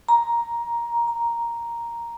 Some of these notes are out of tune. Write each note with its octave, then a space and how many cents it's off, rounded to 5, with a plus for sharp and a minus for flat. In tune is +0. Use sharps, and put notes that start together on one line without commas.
A#5 +10
A#5 +0